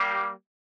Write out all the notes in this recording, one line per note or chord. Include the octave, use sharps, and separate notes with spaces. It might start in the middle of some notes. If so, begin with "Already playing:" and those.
Already playing: G3 A#3 G4